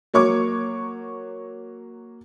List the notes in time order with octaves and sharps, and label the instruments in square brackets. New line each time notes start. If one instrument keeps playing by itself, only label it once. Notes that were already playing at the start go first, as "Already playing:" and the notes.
[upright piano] F#3 A#3 C#5 C#6 D6